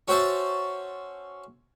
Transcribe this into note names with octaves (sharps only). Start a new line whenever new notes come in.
C#4 F#4 C5 E5 A5